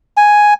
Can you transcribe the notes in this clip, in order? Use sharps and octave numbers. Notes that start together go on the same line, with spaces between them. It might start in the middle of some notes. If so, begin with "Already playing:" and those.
G#5